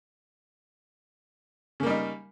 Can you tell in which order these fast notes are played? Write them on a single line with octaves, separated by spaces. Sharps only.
C#3 A#3 G3 D#4